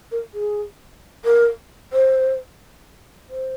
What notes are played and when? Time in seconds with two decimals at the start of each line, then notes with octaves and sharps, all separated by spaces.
0.12 A#4
0.34 G#4
1.25 A#4
1.93 C5
3.29 C5